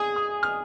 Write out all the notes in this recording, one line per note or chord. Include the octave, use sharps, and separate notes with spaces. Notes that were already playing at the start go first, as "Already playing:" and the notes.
Already playing: G#4 D#6
D#6
F6